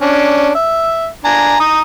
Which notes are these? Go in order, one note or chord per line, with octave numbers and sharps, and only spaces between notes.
C#4 D4
E5
D4 G#5 A#5
A#5 D#6